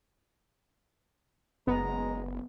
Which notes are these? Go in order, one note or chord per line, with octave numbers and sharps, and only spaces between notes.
F#1 G#3 B3 A#5